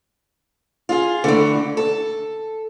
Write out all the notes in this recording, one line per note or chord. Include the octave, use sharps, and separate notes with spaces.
F4 G#4
D3 E3 A3
A4